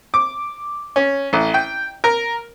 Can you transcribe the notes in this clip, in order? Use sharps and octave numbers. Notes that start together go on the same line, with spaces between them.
D6
C#4
A1
G5
A#4